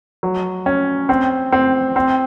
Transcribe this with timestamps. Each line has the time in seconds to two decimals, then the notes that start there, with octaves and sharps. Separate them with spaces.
0.23 F#3
0.66 C#4
1.09 C4
1.53 C4
1.96 C4